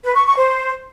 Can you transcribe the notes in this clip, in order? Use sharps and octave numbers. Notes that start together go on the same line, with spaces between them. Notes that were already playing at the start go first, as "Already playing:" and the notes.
B4
C#6
C#6
C5